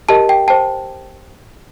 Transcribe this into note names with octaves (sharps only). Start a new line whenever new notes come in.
G4 A#4 D#5 A5
G5
C5 G5 A5